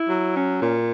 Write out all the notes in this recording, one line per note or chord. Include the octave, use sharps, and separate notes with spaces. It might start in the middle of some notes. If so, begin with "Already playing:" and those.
Already playing: E4
F#3
C#4
A#2